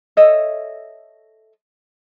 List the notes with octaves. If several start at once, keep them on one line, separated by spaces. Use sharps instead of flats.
A4 C#5 D#5 E5